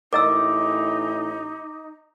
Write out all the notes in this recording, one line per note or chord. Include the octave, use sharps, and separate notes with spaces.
A1 A2 D#4 A#4 D#5 D6 E6